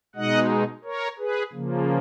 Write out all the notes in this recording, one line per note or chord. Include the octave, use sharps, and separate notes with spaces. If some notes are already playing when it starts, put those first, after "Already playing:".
B2 G#3 D#4 D#5 F#5
A#4 C#5
G#4 B4
C#3 F3 A#3